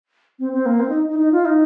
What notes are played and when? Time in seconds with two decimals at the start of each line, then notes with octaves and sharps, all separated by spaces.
0.39 C4
0.53 C4
0.66 A#3
0.80 C4
0.89 D#4
1.09 D#4
1.19 D#4
1.32 F4
1.45 D#4